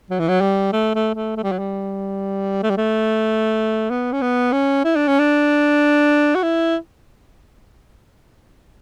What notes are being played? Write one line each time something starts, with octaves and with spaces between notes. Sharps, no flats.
F#3
E3
F#3
G3
A3
A3
A3
A3
G3
F#3
G3
A3
G3
A3
B3
C#4
B3
C#4
E4
D4
C#4
D4
F#4
E4